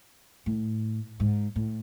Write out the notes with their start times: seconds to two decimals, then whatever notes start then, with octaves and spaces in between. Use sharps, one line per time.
0.46 A2
1.20 G#2
1.56 A2